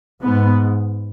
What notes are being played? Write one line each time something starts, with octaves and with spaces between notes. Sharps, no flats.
G#2 B3